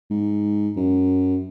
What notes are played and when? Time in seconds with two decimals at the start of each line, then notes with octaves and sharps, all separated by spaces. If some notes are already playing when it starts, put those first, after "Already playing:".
0.11 G#2
0.76 F#2